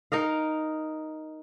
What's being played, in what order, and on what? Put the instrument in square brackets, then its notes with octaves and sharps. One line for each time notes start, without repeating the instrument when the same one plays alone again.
[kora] D#4 A#4 D#5 F5